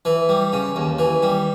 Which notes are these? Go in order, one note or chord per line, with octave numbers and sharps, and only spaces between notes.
E3
G3
C#3
D#2
E3
G3